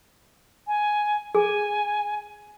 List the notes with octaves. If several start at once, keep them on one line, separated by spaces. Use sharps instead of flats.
G#5
G#4 G#5